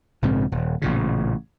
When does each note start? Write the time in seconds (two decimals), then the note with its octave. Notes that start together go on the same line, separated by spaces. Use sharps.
0.22 A#1 G#2 C#3 C4
0.52 D#1
0.82 A1 A#2 C#3